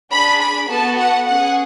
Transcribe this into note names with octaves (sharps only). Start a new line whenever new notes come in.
D4 G#4 B5
B5
B3 F#4 A4 A5
F#5
C#4 G#4 F#5